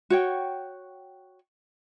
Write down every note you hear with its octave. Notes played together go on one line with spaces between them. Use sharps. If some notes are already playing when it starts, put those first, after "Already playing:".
F#4 C#5 G5